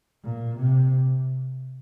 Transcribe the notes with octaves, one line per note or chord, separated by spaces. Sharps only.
A#2
C3